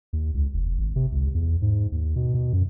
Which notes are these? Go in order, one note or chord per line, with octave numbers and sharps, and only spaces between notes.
D#2
C#2
F1
G#1
C3
C#2
E2
G#2
D#2
B2
B2
F#2